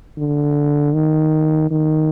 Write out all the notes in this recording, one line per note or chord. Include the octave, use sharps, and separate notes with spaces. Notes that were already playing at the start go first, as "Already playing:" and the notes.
D3
D#3
D#3